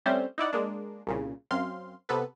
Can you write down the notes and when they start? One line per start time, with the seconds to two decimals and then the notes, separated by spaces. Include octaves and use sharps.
0.06 G3 A3 C4 C#4 G4 C5
0.38 D#4 E4 D5 F#5
0.53 G#3 A#3 D4
1.07 C2 A#2 C#3
1.51 F#2 C4 F5 C6
2.09 C3 B3 A4 B4